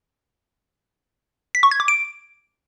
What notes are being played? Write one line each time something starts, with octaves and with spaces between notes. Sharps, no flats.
B6
C#6
G#6
D6
D7